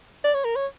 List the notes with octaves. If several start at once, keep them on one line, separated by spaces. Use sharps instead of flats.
D5
C#5
A#4
C#5